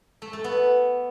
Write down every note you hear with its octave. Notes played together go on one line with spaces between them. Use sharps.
A3
A3
B3